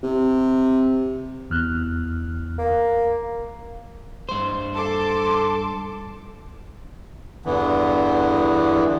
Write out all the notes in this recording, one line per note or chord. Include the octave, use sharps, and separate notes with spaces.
C3
E2 F6 F#6
A#3
G2 C5
A4 C6 D6
E2 G2 D3 E3 B3